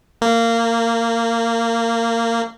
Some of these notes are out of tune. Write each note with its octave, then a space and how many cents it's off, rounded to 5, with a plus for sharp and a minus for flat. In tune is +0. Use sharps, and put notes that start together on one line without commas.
A#3 -20